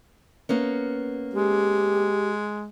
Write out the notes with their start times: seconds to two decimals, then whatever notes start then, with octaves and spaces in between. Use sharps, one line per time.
0.49 A#3 B3 C#4
1.33 G#3 G4